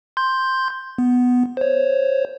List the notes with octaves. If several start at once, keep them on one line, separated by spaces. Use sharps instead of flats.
C6 G6
B3
C5 C#5